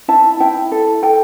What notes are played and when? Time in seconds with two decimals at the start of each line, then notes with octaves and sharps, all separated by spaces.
0.08 E4 A5
0.40 E4 G5
0.72 A4
1.03 A4 G5